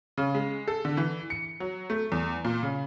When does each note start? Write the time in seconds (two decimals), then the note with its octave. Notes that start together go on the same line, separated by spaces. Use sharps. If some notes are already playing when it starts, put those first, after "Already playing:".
0.18 C#3
0.35 G#3
0.68 A4
0.85 D3
0.97 E3
1.30 C#7
1.60 F#3
1.90 A3
2.12 E2
2.45 A#2
2.63 C#3